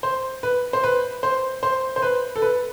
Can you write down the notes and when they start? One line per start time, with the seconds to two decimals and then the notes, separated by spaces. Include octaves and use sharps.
0.03 C5
0.43 B4
0.73 C5
0.84 B4
1.23 C5
1.63 C5
1.96 C5
2.02 B4
2.36 A4
2.42 B4